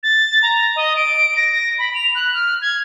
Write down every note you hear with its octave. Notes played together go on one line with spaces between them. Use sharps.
A6
A#5
D#5
D7
A#6
A#6
B5
F7
F#6
F6
G#6